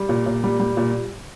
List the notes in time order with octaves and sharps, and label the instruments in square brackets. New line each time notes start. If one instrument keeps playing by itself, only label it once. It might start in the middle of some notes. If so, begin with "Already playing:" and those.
Already playing: [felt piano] G3
A#2
A#2
G3
G3
A#2